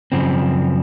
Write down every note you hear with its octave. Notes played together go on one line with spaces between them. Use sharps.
F#2 C#3 F3 C4